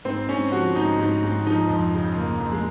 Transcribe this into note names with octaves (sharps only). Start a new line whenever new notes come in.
G#2 C4
G#2 C#4
F3 F#4
G#2 D#4
G#2
G#2
F3 D#4
F2
C#3
F2 A#3
F2
G#3